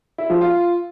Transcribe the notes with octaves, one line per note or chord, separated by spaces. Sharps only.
E4
F3
F4